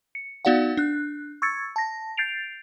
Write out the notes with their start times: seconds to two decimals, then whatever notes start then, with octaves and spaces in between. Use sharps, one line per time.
0.15 C#7
0.45 B3 D#4 F#4 D5 F5 F#5
0.77 D4 F#6
1.42 C#6 E6 G#6 A6 C#7
1.76 A5 A#6
2.17 G6 A6 C7 D7 F7